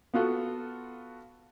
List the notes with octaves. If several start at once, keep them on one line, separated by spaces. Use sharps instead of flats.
B3 F4 F#4 A4